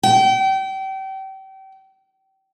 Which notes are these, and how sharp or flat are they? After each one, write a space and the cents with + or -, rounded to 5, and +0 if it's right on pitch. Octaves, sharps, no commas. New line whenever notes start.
G5 -30